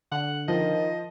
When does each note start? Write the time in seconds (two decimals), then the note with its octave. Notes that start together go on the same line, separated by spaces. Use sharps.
0.12 D3 F#5
0.48 D#3 F3 D#5